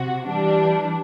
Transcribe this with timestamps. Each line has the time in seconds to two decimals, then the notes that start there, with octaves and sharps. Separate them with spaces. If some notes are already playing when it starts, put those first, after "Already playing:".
Already playing: C3 F#4
0.27 E3 G3 D4